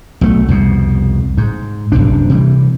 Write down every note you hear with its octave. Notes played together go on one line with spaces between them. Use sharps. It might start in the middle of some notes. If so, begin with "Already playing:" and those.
B1 A3
C2 F2 B2
G#2
F#1 C#2 C3 D4
C3 E3 G3